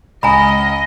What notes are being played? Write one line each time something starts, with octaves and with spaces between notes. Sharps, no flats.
C#2 D#5 G#5 A#5 B5 D#6